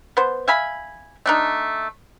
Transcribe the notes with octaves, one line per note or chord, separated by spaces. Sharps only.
B3 C5
E5 F5 G#5 B5
A3 D4 D#4